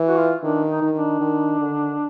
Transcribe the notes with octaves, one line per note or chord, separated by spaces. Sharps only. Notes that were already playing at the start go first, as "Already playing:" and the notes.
Already playing: E3
F#4
F4
D#3 D4
D#4
D#3
D4
D#3
D3